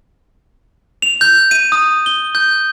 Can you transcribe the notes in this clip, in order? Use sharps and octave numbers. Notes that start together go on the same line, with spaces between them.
F7
G6
D#7
D#6
G7
G6